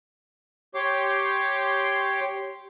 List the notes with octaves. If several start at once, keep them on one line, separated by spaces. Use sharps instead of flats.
G4 C#5 C6 D6